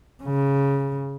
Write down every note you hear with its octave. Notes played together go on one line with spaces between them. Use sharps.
C#3